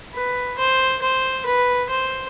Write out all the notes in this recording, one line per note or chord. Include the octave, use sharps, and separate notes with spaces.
B4
C5
C5
B4
C5